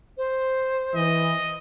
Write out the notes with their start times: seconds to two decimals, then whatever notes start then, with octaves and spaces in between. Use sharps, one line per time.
0.17 C5
0.95 E3 D#5